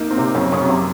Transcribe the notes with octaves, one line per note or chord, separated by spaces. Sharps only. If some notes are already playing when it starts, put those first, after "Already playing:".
Already playing: A#3 D#4
C4
C3
F#2 C#3
C#3
F#2
C3